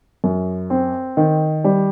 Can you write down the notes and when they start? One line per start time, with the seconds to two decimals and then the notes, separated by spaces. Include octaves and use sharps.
0.24 F#2
0.70 C4
1.17 D#3
1.64 G3